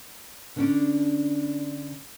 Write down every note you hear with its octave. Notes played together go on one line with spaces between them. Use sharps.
D3 C#4 D4